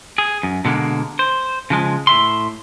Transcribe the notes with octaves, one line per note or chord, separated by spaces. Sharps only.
G#4
F#2
B2 D3 G#3 A#3
C5
C#3 F3 G#3
A2 E5 C6